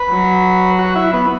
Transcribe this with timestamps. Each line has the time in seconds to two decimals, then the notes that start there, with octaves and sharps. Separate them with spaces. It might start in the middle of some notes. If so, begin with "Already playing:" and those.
Already playing: B4
0.10 F#3
0.79 F#4
0.96 E4
1.13 B3